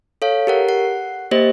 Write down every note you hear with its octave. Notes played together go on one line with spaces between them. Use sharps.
A4 C#5 F5
G4 A#4 F#5
F#5 C7
A#3 G4 C5 D#5 A#6